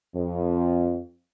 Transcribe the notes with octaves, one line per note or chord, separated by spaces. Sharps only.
F2